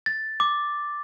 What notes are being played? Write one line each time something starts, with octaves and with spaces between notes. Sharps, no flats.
A6
D6